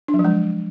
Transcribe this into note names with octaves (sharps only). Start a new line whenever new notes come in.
D4
F#3
F3
G#3